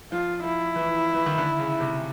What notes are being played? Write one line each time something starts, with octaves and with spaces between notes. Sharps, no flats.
F3 F4
F3 E4
E3
E3
D#3
D3
C#3
C3